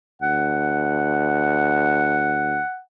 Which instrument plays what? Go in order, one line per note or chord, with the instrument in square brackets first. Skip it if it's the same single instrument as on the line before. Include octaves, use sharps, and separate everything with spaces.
[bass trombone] D2 [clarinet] F#5